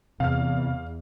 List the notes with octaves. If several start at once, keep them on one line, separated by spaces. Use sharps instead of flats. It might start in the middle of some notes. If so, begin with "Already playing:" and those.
E2 C3 F5 F6